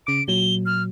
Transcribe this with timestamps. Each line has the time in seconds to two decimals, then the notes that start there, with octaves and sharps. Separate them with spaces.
0.07 C#3 D6 D7
0.28 A#2 F#3 G7
0.66 F6